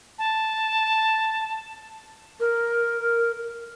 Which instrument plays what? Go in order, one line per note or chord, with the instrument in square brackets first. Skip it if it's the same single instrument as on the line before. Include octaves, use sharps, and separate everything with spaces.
[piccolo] A5
[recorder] A#4